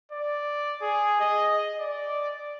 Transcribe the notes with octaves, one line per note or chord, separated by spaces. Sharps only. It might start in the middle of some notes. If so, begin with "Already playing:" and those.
D5
G#4
D#5
D5